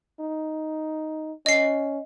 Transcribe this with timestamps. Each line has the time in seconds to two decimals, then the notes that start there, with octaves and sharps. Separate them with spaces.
0.20 D#4
1.46 C#4 D#5 C7